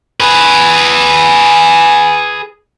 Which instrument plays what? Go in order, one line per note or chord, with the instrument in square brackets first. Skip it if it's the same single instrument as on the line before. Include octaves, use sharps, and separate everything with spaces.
[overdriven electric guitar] G#4 B4